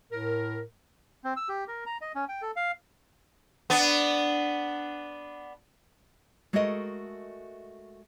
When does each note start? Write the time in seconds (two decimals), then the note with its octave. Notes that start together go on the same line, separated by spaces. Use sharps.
0.11 A2 A#4
1.24 C4
1.37 E6
1.49 G4
1.68 A#4
1.86 A#5
2.01 D#5
2.15 C#4
2.29 G5
2.42 A4
2.56 F5
3.70 B3 D4
6.53 G#3 A3 F#4 A4 A#4 D#5